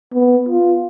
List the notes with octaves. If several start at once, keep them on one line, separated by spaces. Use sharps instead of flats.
B3
F4